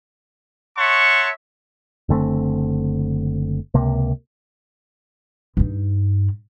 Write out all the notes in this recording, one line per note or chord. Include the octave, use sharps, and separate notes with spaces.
C#5 E5 F#5 A5 C6 C#6
F#1 D3 A3 C4
C#2 C3 A#3
G2 D#4